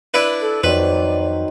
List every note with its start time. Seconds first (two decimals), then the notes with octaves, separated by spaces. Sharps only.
0.14 D4 E4 B4
0.41 A4
0.63 F2 D#3 F#3 B4 C5 D5